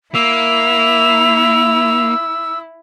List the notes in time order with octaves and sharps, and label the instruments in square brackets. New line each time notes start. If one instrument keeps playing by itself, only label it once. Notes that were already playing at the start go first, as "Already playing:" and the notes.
[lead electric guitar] A#3 [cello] E4 [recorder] E6 [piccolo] F7